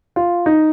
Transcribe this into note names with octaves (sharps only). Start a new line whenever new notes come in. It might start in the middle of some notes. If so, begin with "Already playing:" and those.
F4
D#4